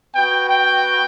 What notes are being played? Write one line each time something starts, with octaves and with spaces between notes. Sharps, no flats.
B3 F#4 G5
G5